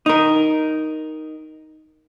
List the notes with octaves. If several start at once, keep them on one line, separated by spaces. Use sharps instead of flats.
D#4 A#4